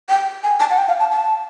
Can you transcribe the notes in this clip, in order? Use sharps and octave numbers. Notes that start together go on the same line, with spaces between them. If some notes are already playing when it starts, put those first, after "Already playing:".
G5
G#5
A5
F#5
G5
F5
A5
A5